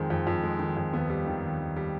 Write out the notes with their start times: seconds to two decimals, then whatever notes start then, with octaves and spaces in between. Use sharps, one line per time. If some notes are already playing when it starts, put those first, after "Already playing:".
Already playing: F2 D#3 G#3 C4
0.10 F2
0.27 F2
0.43 G#3
0.59 D#3
0.77 F2
0.93 D#2 B3
1.09 G3
1.26 D#3
1.43 D#2
1.60 D#2
1.76 G3